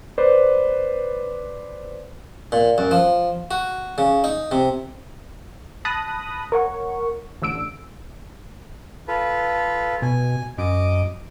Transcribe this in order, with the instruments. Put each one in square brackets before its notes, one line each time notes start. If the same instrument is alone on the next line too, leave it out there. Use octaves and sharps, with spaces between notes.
[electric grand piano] B4 C5 D5
[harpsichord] A#2
F#2
F3
F#4
C#3
D#4
C3
[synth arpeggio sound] A5 B5 D#6 F#6 A#6
A#4 C#5 F#5 C#6
A1 D3 E6 D7
[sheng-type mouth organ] F4 A4 B4
[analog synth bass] B2 [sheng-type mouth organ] G#5
[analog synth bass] F#2 [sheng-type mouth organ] D#5 D6